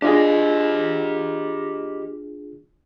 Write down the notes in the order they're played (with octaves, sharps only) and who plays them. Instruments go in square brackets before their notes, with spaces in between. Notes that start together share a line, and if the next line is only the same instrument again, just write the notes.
[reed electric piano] D4 F4 G#4 [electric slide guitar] G4 D#5